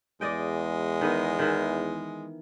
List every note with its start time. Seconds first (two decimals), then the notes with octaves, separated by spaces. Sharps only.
0.21 E2 G#3 D5 D#5 G5
1.01 D#3 B3 D#5
1.39 D#3 E3